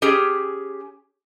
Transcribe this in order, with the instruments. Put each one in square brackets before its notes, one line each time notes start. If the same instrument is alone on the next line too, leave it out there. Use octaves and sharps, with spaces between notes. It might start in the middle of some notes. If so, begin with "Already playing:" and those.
[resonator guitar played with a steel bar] C#4 G4 G#4